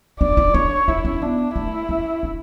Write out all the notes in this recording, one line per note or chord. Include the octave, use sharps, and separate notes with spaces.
D4 D5
E4
D4 C#5
D4 E4
C#4
B3 D4
A3 E4
C#4
D4